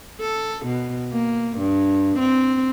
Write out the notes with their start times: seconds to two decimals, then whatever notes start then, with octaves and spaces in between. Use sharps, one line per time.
0.20 A4
0.66 B2
1.12 A#3
1.58 G2
2.19 C4